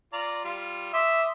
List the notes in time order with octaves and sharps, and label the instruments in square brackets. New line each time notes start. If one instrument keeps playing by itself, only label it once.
[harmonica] F4 D5 A#5
G3 F4
[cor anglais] E5 [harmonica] C6 D6 D#6